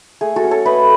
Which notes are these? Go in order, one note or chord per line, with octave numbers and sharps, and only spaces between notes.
A3 G#4
F#4 A4
C#4
A4 C#5
A3 B4 D#5